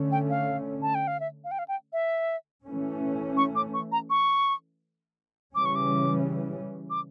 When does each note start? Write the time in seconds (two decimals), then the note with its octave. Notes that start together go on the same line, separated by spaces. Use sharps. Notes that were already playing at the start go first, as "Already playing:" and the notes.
Already playing: D3 A3 C#4
0.12 G5
0.30 F5
0.82 A5
0.95 G5
1.07 F5
1.20 E5
1.44 F5
1.51 G5
1.59 F5
1.68 G5
1.93 E5
2.65 E3 A3 C#4
3.37 C#6
3.56 D6
3.74 C#6
3.92 A#5
4.10 C#6
5.55 C#3 E3 G3 C#4 D6
5.65 C#6
5.75 D6
6.90 D6